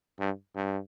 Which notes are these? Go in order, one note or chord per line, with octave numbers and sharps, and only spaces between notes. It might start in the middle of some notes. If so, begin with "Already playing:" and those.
G2
G2